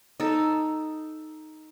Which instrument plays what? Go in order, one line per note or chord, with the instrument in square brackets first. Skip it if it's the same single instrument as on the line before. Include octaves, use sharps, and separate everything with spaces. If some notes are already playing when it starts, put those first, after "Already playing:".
[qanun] D#4 A4